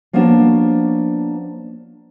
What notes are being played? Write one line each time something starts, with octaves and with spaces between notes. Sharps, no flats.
F3 A#3 B3 C#4 D4 F#4